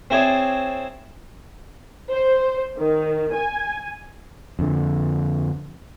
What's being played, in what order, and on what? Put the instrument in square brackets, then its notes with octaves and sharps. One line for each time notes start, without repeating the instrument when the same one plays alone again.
[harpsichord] C4 E4 G#4 C#5 D5
[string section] C5
D#3
G#5
[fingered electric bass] F2 D3